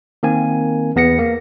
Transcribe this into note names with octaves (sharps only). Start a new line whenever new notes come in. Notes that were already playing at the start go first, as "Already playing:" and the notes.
D#3 A#3 C4 G#5
E2 B3 A#6 C#7
A#3